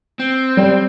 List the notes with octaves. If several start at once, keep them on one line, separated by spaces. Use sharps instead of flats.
C4
G3